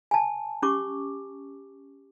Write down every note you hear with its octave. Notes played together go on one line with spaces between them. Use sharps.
G#5 A5
C#4 G4 C#6 D6